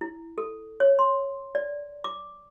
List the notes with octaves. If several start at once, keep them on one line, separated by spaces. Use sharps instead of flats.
E4
A4
C#5
C6
D5
D6